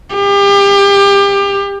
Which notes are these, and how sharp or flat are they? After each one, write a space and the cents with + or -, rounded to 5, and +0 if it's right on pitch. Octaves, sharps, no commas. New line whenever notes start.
G4 +30